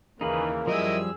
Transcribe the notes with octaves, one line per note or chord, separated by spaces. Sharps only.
D#2 C#3 E3 A#3 D#4 G#4 B4
F#2 F3 G3 E4 G#4 A#4 D#5 E6